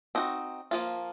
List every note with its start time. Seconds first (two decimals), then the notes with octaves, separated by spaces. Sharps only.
0.15 C4 D#4 F#4
0.71 F3 A#3 F4